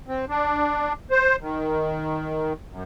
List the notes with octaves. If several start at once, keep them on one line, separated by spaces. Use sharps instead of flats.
C4
D4
C5
D#3
F#2